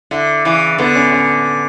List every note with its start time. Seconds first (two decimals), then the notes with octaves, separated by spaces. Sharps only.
0.11 D3 E4
0.45 C#3 E3
0.78 D3 B3
0.95 C#4
1.12 C#4